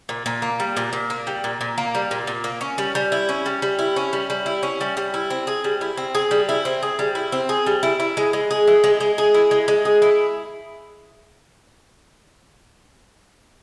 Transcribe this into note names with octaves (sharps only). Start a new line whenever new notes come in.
A#2
A#2
A#3
G3
A#2
A#2
A#3
G3
A#2
A#2
A#3
G3
A#2
A#2
A#3
C#4
G3
G3
E4
C#4
G3
G3
E4
C#4
G3
G3
E4
C#4
G3
G3
E4
C4
G#4
G3
E4
C4
G#4
G3
E4
C4
G#4
G3
E4
C4
G#4
G3
E4
E4
G#3
G#3
G#4
E4
G#3
G#3
G#4
E4
G#3
G#3
G#4
E4